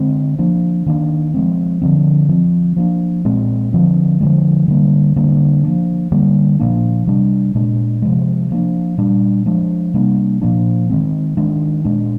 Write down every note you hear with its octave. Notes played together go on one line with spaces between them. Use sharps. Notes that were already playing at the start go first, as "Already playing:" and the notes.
Already playing: D3 G#3 C4
F3 A#3 D4
D#3 A#3 D4
F3 G#3 C4
D3 F3 C4
F3 C4
F3 A#3 D4
A#2 G#3 C4
D3 F3 C4
D3 F3 G#3
D3 G3 A#3
D3 G3 A#3 D4
F3 A#3 D4
D3 G3 A#3
A#2 F3 A#3 D4
C3 G3 D4
A#2 G#3 D4
C3 F3 G#3
F3 A#3 D4
A#2 G3 D4
F3 G#3 D4
C3 G3 A#3 D4
A#2 F3 A#3 D4
D#3 G#3 C4
D#3 G#3 D4
A#2 G#3 D4